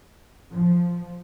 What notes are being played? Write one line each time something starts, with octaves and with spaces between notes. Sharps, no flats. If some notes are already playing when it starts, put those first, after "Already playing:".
F3